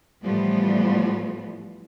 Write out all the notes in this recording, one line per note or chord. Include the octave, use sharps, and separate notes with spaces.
A2 E3 F3 G3 A3 B3